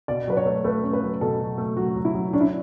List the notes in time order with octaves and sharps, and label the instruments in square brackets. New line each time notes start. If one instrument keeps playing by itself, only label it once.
[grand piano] B2 [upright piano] D5
[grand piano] F#3 [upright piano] B4
[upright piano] C#5
[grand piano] A3
[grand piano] A3 [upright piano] B4
[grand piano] C#4
[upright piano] B4
[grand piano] F#3
[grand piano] B2 [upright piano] A4
[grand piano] F#3
A3
[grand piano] F#3 [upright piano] F#4
[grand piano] F#3
[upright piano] E4
[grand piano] F#3
[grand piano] C#4 [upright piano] D4
[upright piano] E4